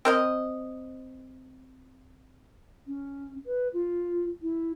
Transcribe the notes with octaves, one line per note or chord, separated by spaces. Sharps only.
C4 A#4 D#5
C#4
B4
F4
E4